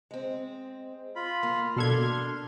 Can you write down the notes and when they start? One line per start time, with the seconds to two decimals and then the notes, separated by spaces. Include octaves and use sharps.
0.11 G#3 C4
1.16 F4 B5
1.43 A#3
1.76 B2 D4 A4 C6 F6 G#6